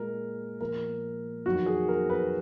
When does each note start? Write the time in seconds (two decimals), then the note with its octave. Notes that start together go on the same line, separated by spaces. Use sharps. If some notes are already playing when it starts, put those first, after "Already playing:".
Already playing: A#2 G#3 A#4
0.61 A#2 F3 A#3 A#4
1.46 F2 D#3 F#3 F#4
1.66 G#4
1.88 A#4
2.10 B4